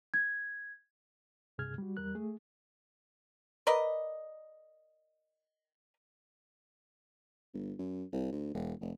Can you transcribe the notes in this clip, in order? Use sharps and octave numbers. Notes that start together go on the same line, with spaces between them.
G#6
C2 G2 C3 G#4 F6 G#6
G3 F#4
E2 G3 A#4 F#6
A3 G#4
A#4 B4 D5 D#5
G1
F#2
C2
D2
E1
F1